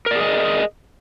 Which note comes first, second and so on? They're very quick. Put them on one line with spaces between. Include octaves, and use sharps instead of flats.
A#4 D5 G#4 D#5